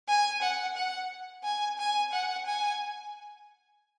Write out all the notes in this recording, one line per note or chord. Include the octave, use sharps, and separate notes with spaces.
G#5
F#5
F#5
G#5
G#5
F#5
G#5